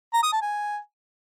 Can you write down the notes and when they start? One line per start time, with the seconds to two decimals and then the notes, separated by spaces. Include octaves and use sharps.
0.14 A#5
0.23 D#6
0.32 A5
0.42 G#5